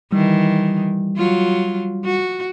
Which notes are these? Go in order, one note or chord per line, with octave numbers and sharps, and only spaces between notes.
D#3 E3 G3
F#3 F4
F#4